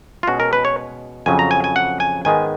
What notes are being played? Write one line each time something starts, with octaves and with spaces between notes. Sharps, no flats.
F4
B2 G#3 C#4 F#4
A#4
B4
C#5
F2 C#3 F#3 C#4 G#5
A#5
G#5
G#5
F#5
G#5
G#2 D#3 G#3 B3 G#5